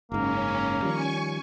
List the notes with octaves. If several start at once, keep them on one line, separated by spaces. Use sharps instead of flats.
F#1 G#2 A#3 C#4
D#3 F3 G3 G#5 C#6